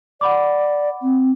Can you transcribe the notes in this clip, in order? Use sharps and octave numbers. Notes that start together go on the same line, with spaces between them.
D5 F#5 B5 D6
C4